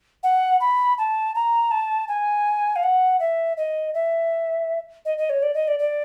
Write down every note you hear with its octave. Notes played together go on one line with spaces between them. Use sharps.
F#5
B5
A5
A#5
A5
G#5
F5
F#5
E5
D#5
E5
D#5
D#5
C#5
D5
D#5
D5
D5